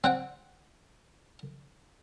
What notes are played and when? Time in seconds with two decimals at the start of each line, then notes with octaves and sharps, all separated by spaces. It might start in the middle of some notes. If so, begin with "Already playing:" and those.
0.04 C4 F#5 G5